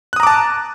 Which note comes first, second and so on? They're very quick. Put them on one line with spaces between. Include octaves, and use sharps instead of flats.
F#6 D#6 A#5 D6 A5